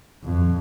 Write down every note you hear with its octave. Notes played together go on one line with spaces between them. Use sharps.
F2